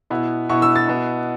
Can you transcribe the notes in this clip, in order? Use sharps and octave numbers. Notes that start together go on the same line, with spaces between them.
B2 B3 E4
B2 B3 E4 C#6
E6
A6
B2 B3 E4